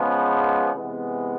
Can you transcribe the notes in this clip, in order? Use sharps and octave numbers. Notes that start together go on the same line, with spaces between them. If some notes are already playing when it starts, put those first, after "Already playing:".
Already playing: C#3 F3 G#3 B3
C3 E3 G#3 B3